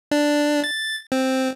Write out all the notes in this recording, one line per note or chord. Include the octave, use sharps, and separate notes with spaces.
D4
A6
C4